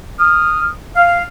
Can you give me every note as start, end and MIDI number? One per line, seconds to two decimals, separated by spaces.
0.20 0.68 87
0.20 0.68 89
0.96 1.23 77